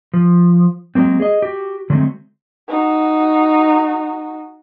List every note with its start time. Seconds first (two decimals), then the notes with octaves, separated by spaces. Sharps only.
0.13 F3
0.95 F#3 G#3 A#3 C4
1.20 G#4 D#5
1.42 F#4 G4
1.90 D3 F#3 G#3 A3 C4
2.69 D#4 F#4